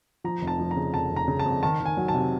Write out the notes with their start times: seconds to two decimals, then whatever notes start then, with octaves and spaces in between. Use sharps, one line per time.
0.24 F3 A#5
0.41 F1
0.47 A5
0.60 F3
0.71 A#5
0.77 C#3
0.94 F1 A5
1.11 F1
1.16 A#5
1.28 C#3
1.39 A5
1.46 F2
1.63 D#3 A5
1.80 D#3
1.86 G#5
1.97 F#3
2.08 A5
2.14 C3